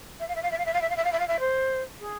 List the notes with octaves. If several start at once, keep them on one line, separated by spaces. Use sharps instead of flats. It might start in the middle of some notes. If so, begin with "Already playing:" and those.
E5
F5
E5
F5
E5
F5
E5
F5
E5
F5
E5
F5
E5
F5
E5
C5
G#4